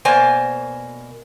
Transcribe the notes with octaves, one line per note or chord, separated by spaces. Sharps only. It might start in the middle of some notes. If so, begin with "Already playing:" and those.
B2 A#3 C5 D5 G#5